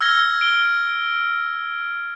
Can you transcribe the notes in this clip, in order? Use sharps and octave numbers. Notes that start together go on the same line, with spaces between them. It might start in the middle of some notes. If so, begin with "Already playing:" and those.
E6 F6 G#6 A#6 G7
D7 G7